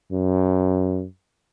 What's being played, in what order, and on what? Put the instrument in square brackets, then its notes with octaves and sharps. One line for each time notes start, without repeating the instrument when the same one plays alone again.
[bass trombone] F#2